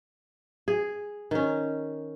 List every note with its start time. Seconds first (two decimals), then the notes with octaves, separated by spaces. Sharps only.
0.68 G#4
1.31 D#3 C#4